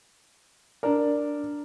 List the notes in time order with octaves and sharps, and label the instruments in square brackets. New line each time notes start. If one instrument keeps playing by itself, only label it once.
[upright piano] D4 A#4 [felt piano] D5